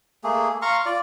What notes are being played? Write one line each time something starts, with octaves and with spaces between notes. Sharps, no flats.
A3 A#3 G#4
F5 A#5 C6 C#6
F4 D5